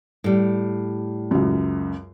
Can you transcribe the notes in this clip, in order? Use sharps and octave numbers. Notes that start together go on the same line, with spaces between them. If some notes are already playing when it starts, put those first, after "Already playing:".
A2 G3
C#2 F#2